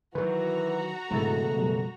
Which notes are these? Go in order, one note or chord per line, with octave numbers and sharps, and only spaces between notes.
D#3 E3 F#3 F#4 B4 A#5
E1 G#2 C#3 A3 E4 A6
F#2 B2 G3